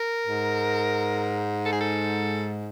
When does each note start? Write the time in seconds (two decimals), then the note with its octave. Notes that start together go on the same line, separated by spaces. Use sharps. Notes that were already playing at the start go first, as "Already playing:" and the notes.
Already playing: A#4
0.27 G#2
1.66 A4
1.73 G#4
1.81 A4